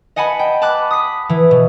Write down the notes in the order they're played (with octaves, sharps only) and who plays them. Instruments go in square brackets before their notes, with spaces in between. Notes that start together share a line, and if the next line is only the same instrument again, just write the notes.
[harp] D#5 F#5 G#5 A5 B5
G5
A5 B5 D6 F#6
D#6 B6
E3
B2